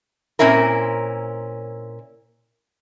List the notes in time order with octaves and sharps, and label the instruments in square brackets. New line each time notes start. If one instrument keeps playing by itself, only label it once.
[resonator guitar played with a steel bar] A#2 C4 C#4 E4 A#4